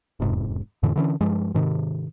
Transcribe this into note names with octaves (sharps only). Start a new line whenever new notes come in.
E1 F2 G#2 C3
F2 A2 D3 E3
D3 E3 C#4
G2 F3 G#3
G#2 C3 D#3